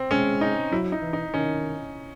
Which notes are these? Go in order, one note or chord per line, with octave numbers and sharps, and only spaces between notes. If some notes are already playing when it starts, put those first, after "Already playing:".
Already playing: C4
G#3 C#4
D#4
F#3 E4
D#4
E3
D#4
D#3 C#4